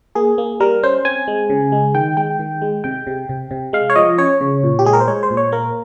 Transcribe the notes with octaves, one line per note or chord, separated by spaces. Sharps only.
A#3 G#4
A#3
G3 A#4
C#4 C5
C4 G#5
G#3
C#3
G#3
D#3 G5
G#3 G5
D#3
G#3
C3 G5
C3
C3
C3
G#3 F5
C#5
F3 D#5
C#4 C#5
C#3
A#2
G4
G#3 G#4
A#4
C5
G#3 C#5
C5
A#2
C#5
A#3 A#4